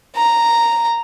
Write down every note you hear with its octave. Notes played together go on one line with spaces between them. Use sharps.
A#5